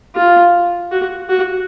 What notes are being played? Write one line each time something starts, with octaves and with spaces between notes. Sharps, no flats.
F4
F#4
F#4